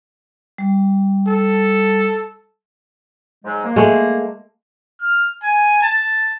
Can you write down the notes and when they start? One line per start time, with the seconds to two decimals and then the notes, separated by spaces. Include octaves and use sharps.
0.58 G3
1.27 A4
3.45 G#2 F#3 G#3
3.64 A#3
3.76 G#3 A3
5.02 F6
5.43 G#5
5.82 A5